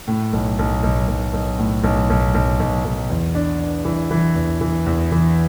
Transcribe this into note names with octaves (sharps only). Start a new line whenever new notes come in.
A2
B1
B1
B1
B1
B1
A2
B1
B1
B1
B1
B1
E2
D4
D4
E3
E3
E2
E3
E2
E3